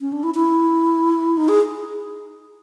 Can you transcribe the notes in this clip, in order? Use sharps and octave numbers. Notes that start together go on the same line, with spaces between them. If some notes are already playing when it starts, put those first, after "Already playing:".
C#4
D4
E4
E4
D#4
G#4